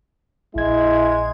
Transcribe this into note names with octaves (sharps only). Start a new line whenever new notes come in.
A#1 G#3 E4 G#6